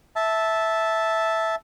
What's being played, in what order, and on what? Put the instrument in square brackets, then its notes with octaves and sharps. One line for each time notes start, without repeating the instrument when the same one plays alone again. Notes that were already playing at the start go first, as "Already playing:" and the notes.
[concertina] E5 A5